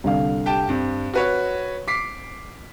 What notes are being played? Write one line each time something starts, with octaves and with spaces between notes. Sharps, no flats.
C2 D3 F5
G4 G5 A5
G2 C4
F#4 B4 C#5
D6 B6 C7